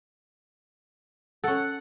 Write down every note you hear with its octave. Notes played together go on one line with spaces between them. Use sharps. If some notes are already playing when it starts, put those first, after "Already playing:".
C#4 A4 F#5